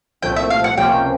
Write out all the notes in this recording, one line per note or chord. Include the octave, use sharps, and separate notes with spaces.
C2 A#2 F3 A3 C4 G5
E5
F5
F#5
C#2 C3 F3 A#3 C#4 G5